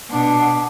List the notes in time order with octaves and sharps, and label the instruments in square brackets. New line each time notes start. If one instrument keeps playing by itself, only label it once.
[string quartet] B2 [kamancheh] D4